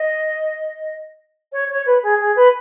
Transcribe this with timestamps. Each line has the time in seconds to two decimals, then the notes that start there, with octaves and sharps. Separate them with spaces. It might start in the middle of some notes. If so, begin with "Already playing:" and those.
Already playing: D#5
1.52 C#5
1.70 C#5
1.86 B4
2.03 G#4
2.20 G#4
2.36 B4